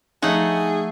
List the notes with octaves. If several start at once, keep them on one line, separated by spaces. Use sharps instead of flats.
F3 A3 D#4 G#4 C#5 F#5